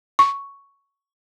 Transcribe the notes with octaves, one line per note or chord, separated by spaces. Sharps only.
C#6